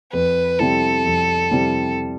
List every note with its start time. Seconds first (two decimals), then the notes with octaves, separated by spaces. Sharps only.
0.13 F2 B4
0.59 C3 G3 C4 E4 A4
1.05 F2
1.51 C3 G3 C4 E4